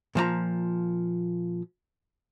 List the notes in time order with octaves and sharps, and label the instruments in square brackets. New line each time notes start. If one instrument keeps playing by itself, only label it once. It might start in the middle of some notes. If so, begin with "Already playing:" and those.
[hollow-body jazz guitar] A#2 F3 D5 A#5